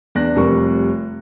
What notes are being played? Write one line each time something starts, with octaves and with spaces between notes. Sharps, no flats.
E2 D4 D5 F#6 A#6
F1 F2 G3 A#4 C#6